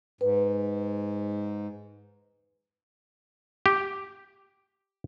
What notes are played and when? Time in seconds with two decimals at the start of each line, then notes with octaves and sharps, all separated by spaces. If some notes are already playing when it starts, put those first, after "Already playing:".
0.21 G#2 B4
3.66 G4